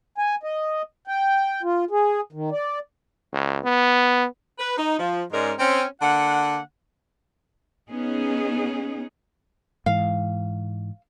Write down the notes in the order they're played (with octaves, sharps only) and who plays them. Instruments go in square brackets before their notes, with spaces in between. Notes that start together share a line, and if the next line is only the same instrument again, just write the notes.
[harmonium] G#5
D#5
G5
F4
G#4
D#3
D5
[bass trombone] C#2
B3
[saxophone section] B4
D#4
F3
G#2 G#3 C#4 A#4 D5
C4 C#4
D3 A#3 F#5
[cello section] B3 C#4 D#4 G#4
[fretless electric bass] G#2 E3 [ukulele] F5